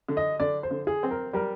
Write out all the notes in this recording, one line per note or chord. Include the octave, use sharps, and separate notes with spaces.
D3
D#5
D3 D5
C5
D3
G#4
C4
A#4
G3 A#4